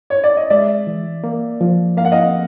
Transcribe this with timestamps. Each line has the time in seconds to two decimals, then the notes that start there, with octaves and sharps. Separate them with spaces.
0.10 C#5
0.24 D5
0.37 D#5
0.50 G#3 D5 E5
0.87 E3
1.24 A#3
1.61 F3
1.97 A#3 F5
2.05 F#5
2.12 D#5 F5